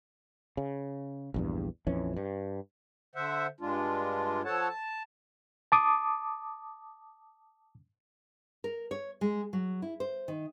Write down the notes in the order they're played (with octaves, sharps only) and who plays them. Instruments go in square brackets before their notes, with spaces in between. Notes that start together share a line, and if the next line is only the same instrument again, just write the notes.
[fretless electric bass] C#3
A#1 E2 G2
A#1 F2 E3 C#4
G2
[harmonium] D3 C5 E5 F#5
G2 G#3 D4 F4
F3 A4 C#5 F#5 A5
A5
[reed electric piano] A5 D6 D#6
[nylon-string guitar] A#4
C#5
G#3
F#3
E4
C5
D#3